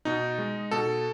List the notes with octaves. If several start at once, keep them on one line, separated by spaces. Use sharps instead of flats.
B2 D#4
G#3
B2 A4